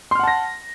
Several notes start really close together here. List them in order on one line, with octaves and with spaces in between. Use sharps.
C6 F6 F#5 A5 A#6